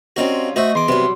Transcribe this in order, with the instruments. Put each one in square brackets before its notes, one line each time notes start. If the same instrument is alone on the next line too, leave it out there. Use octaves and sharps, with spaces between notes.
[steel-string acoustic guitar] G3 C#4 F4 [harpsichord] C4 D#4 F#4
[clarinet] A3 [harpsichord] F#4 C5 E5 [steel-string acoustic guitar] D#5
[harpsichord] E2 D6 [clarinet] C6
[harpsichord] C3 B3 [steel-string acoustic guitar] F#3 G3